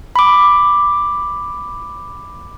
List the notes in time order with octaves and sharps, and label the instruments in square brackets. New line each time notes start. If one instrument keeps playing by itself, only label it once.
[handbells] B5 D6